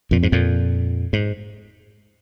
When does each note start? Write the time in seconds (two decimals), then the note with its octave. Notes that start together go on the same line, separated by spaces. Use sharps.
0.11 F2 A#2
0.23 G#2
0.32 F2 A#2
1.13 G#2